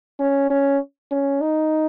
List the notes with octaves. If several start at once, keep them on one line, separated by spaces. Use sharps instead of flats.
C#4
C#4
C#4
D#4